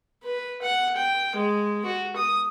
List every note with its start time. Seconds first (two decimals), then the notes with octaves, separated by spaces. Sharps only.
0.23 B4
0.62 F#5
0.96 G5
1.36 G#3
1.85 F#4
2.16 D#6